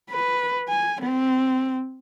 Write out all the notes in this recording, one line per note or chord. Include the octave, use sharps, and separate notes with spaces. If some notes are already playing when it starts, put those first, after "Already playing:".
B4
G#5
C4